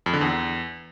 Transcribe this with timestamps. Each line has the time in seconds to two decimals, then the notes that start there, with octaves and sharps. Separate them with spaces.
0.06 F2
0.14 D3
0.21 E2